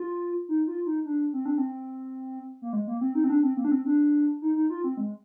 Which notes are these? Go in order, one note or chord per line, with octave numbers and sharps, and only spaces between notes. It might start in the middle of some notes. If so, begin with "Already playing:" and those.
Already playing: F4
D#4
F4
D#4
D4
C4
D4
C4
A#3
G#3
A#3
C4
D#4
C4
D4
C4
A#3
D4
C4
D4
D#4
D#4
F4
C4
G#3